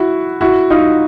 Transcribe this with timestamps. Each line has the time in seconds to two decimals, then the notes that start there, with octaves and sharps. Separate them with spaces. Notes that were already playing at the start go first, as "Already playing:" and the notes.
Already playing: E4 F#4
0.41 E4 F#4
0.70 D#4 F4